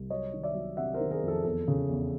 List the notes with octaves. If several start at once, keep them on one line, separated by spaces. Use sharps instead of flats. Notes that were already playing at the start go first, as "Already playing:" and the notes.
Already playing: C2
F#3 C#5 D#5
D#3
D5 E5
F#3
C3 E5 F#5
A#4 C5
D#3
G#4 A#4
F2 A4
E2 A4
C#3
E2